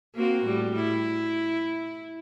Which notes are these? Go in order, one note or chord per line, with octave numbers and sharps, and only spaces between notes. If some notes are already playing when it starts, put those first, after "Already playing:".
A#3 C4 F#4
A2 G3
E4